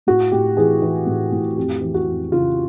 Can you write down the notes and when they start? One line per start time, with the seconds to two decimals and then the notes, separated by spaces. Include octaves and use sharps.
0.07 A2 F#4
0.32 A2 G4
0.57 E3 G#4
0.82 E3
1.07 A2
1.32 A2
1.57 F2 G4
1.81 E3
1.94 F#4
2.07 F2
2.32 C#3 F4